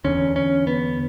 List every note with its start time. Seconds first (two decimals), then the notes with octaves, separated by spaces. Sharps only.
0.04 E2 D3 C#4
0.36 C#4
0.67 B3